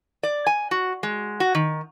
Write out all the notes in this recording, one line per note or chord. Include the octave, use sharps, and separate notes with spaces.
D5
G#5
F#4
G#3
F#4
D#3